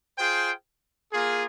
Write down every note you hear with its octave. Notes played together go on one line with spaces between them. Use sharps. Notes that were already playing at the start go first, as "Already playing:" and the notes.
F4 G#4 C5 G5
A#3 F4 G#4